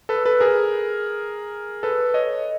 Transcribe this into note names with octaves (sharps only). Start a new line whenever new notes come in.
A4 B4
A4 B4
G#4 A#4
A4 B4
C#5 D#5